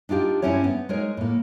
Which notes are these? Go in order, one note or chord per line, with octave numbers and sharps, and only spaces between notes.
D4 D#4 F4 G4
G2 D#3 C4 C#4 E4 C#5
B3
G#3 D#4 A#4 C#5
A2 A#3